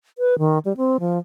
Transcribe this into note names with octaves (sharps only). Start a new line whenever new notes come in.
B4
D#3
G3
C4
F3